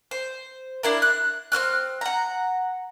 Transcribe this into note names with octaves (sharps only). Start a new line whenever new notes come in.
C5
D4 E4 A#4
F#6
C4 C5 F6 F#6
F#5 A#5